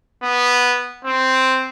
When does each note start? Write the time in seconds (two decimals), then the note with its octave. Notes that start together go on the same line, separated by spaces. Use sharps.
0.22 B3
1.05 C4